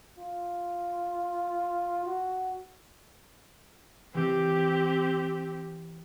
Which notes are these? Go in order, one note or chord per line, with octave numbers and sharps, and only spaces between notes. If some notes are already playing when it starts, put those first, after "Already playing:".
F4
F#4
E3 C4 G4